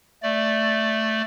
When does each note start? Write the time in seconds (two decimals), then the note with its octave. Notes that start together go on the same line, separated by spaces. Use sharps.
0.23 A3 D5